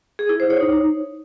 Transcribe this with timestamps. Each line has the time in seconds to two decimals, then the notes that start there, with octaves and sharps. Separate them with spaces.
0.19 G#4
0.29 E4
0.40 C5
0.50 C#5
0.60 D#4